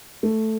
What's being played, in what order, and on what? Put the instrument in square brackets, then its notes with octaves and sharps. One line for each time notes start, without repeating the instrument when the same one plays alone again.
[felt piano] A3